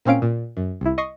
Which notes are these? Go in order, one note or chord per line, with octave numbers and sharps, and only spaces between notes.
A#2 C4 C#4 F5 D7
A#2
F#2
C2 E4
D#5 C#6 D#6 C7